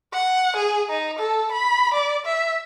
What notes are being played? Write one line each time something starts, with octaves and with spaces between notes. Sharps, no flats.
F#5
G#4
D#4
A4
B5
D5
E5